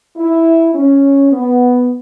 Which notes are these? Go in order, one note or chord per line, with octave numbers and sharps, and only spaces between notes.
E4
C#4
B3